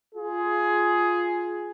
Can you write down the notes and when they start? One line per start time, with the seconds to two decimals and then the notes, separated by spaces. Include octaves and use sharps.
0.14 F4 G#4